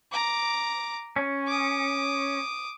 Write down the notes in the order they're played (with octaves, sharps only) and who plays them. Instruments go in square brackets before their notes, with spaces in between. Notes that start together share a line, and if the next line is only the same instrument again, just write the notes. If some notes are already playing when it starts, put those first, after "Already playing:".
[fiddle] A#5 D6
[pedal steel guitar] C#4
[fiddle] D6 D#6